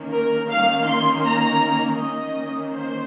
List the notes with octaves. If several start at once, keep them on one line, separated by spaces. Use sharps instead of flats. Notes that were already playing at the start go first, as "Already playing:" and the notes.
Already playing: D#3 A#3 C#4
A#4
D#3 A#3 C#4 F5
C6
A#5
D#3 A#3 C#4 D#5
C5